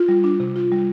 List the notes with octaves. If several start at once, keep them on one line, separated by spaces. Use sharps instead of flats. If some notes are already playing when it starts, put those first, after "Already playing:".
Already playing: F4
G3
D4
C3
F4
G3